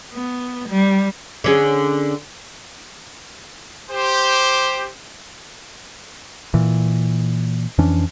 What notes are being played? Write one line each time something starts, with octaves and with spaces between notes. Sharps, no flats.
B3
G3
D3 C#4 G#4
G4 C5
A#2 E3
F2 E3 C#4 D4